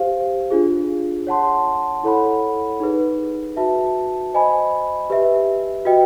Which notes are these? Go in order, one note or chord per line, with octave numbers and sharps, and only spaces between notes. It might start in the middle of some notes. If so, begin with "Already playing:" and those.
Already playing: G4 C5 F5
D4 F4 G#4
C#5 F#5 A5 C6
E4 A4 C#5 F#5 B5
D#4 G#4 B4
F#4 B4 E5 A5
C5 D#5 G#5 B5
G4 B4 E5
F#4 B4 D#5 G5